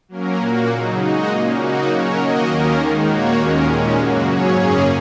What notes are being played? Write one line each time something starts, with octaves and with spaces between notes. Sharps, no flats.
F#3 A#3 C#4 A#4
A#2 A#3 F#4
C#3 F#3 D#4
G#3 D#4 F#4 D#5
A#2 A#3 C#4
C#3 A#3 D#4 F#4
F#3 C#4 A#4 C#5
D#3 A#3 F#4 D#5
D#2 D#3 A#3 C#4 A#4
D#3 G#3 D#4
A#2 A#3 F#4 C#5
D#2 D#3 G#3 C#4 A#4
A#2 G#3 C#4
F#2 C#3 F#3 A#3 F#4
G#2 F#3 C#4 G#4 C#5
F#2 C#3 A#3 C#4 G#4